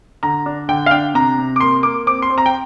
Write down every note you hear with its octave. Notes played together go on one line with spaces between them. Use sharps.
D3 A#5
D4
D3 G5
F5
D4 G5
C3 A#5
C3
D6
A#3 C6
A#3 D6
C4 D6
C6
C4
A#5
G5